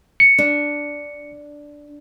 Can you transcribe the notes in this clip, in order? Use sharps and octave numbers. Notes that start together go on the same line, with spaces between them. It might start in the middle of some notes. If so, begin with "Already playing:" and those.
C#7
D4